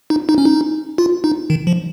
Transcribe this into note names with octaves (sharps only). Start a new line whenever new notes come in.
D#4
D#4
C#4
D#4
F4
D#4
D#3
F3